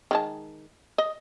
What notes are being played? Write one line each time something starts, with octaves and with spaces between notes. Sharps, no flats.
D#3 G#3 A5
D#5